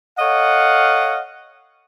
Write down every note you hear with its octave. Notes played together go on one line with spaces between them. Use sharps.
A4 C#5 D#5 F5 F#5